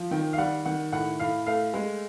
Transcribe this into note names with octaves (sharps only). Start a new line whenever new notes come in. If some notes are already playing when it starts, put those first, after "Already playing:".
Already playing: F3
D#3 G5
F5
G3 F#5
D#3 F#5
A2 F#5
A2 F5
A3 F5
G#3